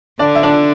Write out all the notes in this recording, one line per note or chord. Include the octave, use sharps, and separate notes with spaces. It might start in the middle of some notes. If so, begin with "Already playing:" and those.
D3 D4 D5
E5
D4 D5